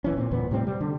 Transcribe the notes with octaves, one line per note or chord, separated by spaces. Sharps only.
D1 E3 C#4
A#2 C4
G1 E2 A#2 B3
A2 C3 G3 C4
G3
D3